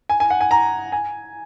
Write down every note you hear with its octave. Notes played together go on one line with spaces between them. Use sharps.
G#5
G#5
F#5
G#5
A#5
G#5